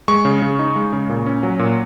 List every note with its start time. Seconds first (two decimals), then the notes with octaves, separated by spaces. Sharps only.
0.08 G#3 C#6
0.25 C#3
0.42 C#3
0.59 D#4
0.76 G#3
0.93 C#3
1.09 A#2
1.26 C#4
1.43 F#3
1.59 A#2